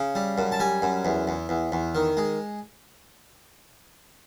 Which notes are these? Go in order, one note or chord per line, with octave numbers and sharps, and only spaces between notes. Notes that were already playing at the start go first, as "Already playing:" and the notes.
Already playing: C#3
G3
F#2
A5
G3 G#5
F#2
E2
E2
E2
E2
D#3
G#3